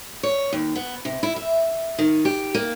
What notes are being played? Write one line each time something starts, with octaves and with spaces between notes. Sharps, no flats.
C#5
D#2
B3
C3
E4
E5
D#3
G4
A#3